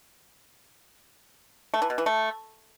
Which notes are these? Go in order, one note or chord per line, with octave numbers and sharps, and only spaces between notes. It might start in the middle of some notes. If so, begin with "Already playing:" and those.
A3
E3
B2
E3
A3